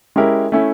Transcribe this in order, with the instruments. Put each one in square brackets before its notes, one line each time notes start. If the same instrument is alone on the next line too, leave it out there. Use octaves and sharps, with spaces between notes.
[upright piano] G#3 C#4 E4 G4 A#4
A3 C#4 E4